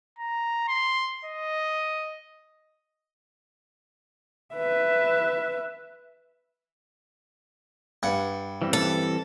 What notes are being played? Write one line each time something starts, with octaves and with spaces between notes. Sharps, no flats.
A#5
C6
D#5
B4 E5
G2 F#5
E3 G3 C4
A4